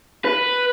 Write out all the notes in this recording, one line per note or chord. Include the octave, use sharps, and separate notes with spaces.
B4